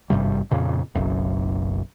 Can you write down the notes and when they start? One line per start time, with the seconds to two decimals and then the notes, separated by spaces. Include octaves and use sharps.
0.10 G#1 G2 C3 G3
0.51 F2 A#2 C#3
0.95 F#1 B1 F#2